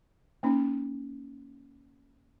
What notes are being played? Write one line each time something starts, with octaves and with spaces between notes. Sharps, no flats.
A#3 C#4 D#4